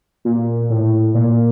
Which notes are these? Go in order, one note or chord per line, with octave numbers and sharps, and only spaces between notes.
A#2
A2
A#2